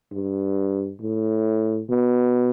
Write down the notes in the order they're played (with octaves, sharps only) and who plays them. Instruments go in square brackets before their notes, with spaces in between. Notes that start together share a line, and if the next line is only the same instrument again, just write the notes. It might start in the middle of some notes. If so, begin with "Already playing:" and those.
[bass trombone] G2
A2
B2